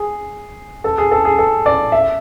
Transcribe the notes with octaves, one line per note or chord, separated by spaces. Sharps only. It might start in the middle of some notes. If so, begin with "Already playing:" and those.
Already playing: G#4
A4
G#4
A4
G#4
A4
D5
E5